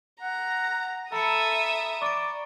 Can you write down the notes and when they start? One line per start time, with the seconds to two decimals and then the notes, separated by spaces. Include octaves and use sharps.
0.21 F#5 A#5
1.12 A4 E5 A#5 B5 D#6 C#7
2.02 D5 C#6 D7